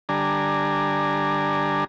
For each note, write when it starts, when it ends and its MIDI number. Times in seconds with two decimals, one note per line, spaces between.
0.09 1.84 50
0.09 1.84 55
0.09 1.84 62
0.09 1.84 80
0.09 1.84 82